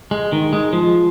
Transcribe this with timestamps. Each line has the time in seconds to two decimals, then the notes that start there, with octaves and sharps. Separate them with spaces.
0.11 G#3
0.32 D#3
0.53 G#3
0.73 F3